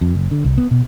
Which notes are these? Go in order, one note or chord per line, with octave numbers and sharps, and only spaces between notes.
F2
F#1
D3
C2
B3
B2